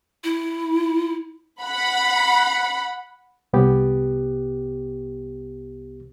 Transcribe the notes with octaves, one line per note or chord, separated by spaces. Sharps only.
E4
F#5 B5
C2 B3 G4